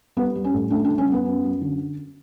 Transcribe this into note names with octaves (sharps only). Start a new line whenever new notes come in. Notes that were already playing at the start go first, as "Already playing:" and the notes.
G3 B3
G3
C#4
A2
A3 D4
D4
C#3
C#4
F#2
B3
F#2
F#2
D3